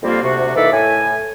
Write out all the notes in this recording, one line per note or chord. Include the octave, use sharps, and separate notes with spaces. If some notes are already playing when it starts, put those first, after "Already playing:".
F2 D3 G3 A#3 C4 F4
D2 C3 F#4
E3 A#3 D#4 A4 D5 E5
A2 G#5